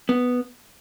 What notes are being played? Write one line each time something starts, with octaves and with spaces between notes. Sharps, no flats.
B3